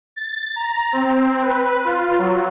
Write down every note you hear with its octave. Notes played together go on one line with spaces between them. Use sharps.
A6
A#5
C4
B4
F4
F#3